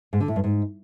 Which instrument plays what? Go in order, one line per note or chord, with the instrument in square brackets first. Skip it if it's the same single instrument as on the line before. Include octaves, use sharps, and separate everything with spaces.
[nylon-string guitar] G#2
D3
A2
G2
G#2